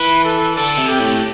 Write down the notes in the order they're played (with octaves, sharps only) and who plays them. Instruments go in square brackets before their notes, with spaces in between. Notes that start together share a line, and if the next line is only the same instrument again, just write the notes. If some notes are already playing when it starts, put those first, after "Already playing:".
Already playing: [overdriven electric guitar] E3 [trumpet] B4
[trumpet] A4
[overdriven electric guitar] D3 [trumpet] A4
[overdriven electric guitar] C3
[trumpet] G4
[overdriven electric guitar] A2